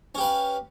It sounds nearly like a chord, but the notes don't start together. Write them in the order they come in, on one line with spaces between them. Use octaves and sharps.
C#4 G4 B4 F5